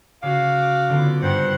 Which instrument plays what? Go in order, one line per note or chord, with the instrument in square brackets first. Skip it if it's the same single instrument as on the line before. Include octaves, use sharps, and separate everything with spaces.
[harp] C#3 [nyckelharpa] F#4 D6 [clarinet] F5
[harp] D3 B3 F4
[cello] G2 [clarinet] C5 [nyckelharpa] F#5